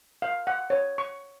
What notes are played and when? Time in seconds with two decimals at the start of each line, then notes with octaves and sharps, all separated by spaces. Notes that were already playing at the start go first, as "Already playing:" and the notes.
0.22 F5
0.47 F#5
0.70 C#5
0.98 C#6